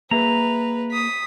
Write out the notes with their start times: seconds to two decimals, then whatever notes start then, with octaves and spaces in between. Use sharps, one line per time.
0.11 A#3 G#4 B4 E5 A#5
0.92 D#6 B6